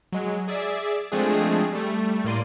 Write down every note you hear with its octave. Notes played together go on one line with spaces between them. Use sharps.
F#3 G#3
G#4 D5 E5
F3 G#3 A3 C4 D4 G#4
G3 A3
A2 A#3 D5 C6 D#7